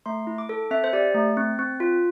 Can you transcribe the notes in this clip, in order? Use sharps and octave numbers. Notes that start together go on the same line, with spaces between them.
A3 C6
E4
D6
A4
C4 E5
C5
G4 D5
A3
C4
C4
F4